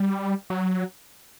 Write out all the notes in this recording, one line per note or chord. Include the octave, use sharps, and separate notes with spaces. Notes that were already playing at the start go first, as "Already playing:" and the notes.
Already playing: G3
F#3